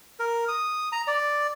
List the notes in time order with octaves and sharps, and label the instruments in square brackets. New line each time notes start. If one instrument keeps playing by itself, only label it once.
[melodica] A#4
D#6
A#5
D5